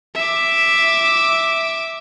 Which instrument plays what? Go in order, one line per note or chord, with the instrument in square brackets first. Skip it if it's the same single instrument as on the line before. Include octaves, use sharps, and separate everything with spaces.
[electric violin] E5 D6